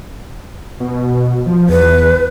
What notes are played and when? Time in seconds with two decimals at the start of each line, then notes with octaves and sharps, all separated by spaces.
0.80 B2
1.46 F3
1.69 E2 B4